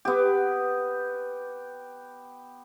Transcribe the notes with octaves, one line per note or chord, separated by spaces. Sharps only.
B3 G4